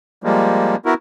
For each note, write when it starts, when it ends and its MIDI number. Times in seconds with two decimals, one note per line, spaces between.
0.24 0.76 53
0.24 0.76 55
0.24 0.76 56
0.24 0.76 58
0.86 0.94 59
0.86 0.94 64
0.86 0.94 66
0.86 0.94 70